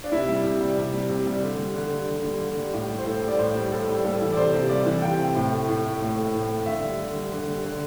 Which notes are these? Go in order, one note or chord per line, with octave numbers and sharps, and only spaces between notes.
D4
C3 E4
G3
C3
G3
C3
G3
C3
G3
D3
G3
D3
G3
D3
G3
D3
G3
A2 G4
G3
C5
A2 A4
G3
D5
A2 C5
G3
A2 A4
G3
G3 A4
E3
D5
C3 C5
C3
G3 D5
E3
C3 G5
C3
A2
A3
A2
A3
A2
A3
A2
A3
D3 E5
G3
D3
G3
D3
G3
D3